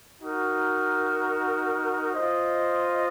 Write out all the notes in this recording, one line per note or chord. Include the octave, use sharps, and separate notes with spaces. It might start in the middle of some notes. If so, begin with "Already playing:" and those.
D#4 F#4 A#4
F4 C5 D#5